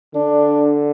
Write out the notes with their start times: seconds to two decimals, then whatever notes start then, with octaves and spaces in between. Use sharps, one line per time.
0.14 D3 D4